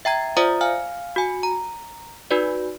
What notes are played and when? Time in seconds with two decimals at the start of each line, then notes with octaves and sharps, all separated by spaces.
0.05 E5 G5 A#5 G#6
0.37 F4 C5 D5 E5 A#5 D#6
0.61 F5 G#5 F6
1.16 F#4 G#5
1.43 A#5
2.31 D#4 F#4 B4 D5